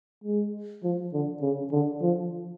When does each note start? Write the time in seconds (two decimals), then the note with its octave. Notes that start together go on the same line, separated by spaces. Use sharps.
0.24 G#3
0.83 F3
1.13 D3
1.42 C#3
1.72 D3
2.02 F3